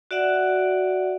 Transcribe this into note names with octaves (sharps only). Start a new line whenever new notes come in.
F#4 D5 E5 F#5